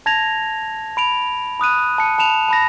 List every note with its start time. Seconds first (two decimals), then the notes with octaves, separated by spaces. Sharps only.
0.06 A5 G#6 A#6 F7
0.97 B5 D7 F7
1.60 B5 D#6 F#6 D#7
1.98 A5 C#7
2.18 A5 B5 E7 F7
2.48 A5 B5 A#6